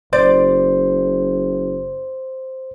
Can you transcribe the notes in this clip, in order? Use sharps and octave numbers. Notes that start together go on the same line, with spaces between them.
F#1 C5 D5